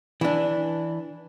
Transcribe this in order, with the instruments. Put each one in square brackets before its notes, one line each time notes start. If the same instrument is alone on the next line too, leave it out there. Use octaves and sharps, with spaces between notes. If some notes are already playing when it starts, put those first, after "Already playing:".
[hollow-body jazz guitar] E3 D4